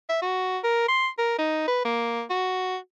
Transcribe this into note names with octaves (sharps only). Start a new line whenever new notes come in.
E5
F#4
A#4
C6
A#4
D#4
B4
A#3
F#4